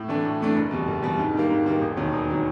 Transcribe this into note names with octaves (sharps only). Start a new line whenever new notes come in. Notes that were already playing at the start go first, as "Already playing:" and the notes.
Already playing: A2
E3 A3 D4
A2
E3 A3 D4
F#1
E2 B2 G3
F#1
E2 B2 G3
G#2
D#3 G3 A#3
G#2
D#3 G3 A#3
E1
D#2 D#3 F#3
E1
D#3 F#3